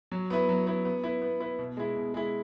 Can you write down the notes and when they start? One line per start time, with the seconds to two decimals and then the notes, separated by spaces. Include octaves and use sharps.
0.12 F#3
0.30 B3 E4 B4
0.49 F#3
0.67 B3 E4 B4
0.85 B3
1.04 E4 B4
1.22 B3
1.40 E4 B4
1.59 B2
1.77 G#3 E4
1.96 B2
2.14 G#3 E4